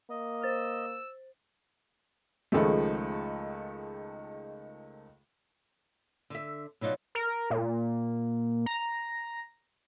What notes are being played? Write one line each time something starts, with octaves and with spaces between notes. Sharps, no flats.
A#3 D#5
C5 E6 A6
C#2 D#3 F3 G#3 A3
D3 E5
B2 F#3 D#4 F4 D5
A#4
A#2
A#5